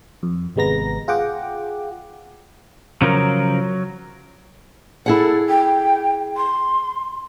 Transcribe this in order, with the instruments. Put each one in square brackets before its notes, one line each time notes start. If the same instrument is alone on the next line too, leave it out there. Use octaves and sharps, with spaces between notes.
[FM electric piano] F2
G#1 C3 G#3 B3 A#5 A#6
F4 G#4 F#5 G5 D6
[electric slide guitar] C#3 F3 A#4 [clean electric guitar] F#3
[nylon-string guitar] E4 G#4 F#5 [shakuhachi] A4
[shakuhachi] G5
C6